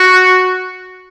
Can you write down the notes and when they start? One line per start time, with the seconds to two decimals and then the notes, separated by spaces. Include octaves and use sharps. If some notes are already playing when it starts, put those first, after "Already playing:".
Already playing: F#4